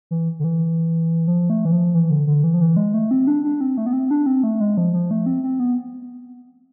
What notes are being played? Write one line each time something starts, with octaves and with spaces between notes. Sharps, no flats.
E3
D3
E3
F3
A3
E3
F3
E3
D3
D3
E3
F3
E3
G#3
A3
C4
D4
D4
C4
A3
B3
C4
D4
C4
A3
G#3
F3
F3
A3
C4
C4
B3